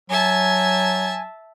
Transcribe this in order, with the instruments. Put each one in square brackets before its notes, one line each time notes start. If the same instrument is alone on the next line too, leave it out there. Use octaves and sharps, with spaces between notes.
[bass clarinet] F#3 [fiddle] E5 A5 [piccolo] G#5